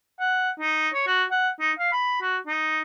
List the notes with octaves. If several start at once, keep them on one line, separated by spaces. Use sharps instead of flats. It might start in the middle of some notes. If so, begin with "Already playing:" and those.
F#5
D#4
C#5
F#4
F#5
D#4
F5
B5
F#4
D#4